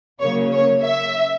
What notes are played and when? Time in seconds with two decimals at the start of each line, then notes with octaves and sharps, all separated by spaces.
0.20 C#3 F#3 A#3 C#5
0.52 C#5
0.83 E5